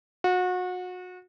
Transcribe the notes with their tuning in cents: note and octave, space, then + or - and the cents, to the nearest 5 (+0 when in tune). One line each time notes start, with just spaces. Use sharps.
F#4 -30